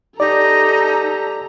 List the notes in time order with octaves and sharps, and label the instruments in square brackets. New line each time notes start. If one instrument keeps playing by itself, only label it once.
[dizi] D#4 [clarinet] G4 [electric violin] A4 A#5 [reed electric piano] D5